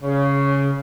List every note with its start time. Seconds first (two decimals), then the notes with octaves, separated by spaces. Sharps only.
0.03 C#3